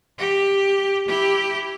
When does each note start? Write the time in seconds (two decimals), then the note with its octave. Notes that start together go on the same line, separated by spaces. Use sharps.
0.19 G4
1.08 E4 G4